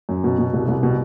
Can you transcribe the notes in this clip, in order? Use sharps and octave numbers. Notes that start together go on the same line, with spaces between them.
F#2
B2
B2
C2
C2
B2